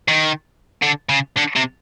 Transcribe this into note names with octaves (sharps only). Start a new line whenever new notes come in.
D#3
D3
C#3
D3
C3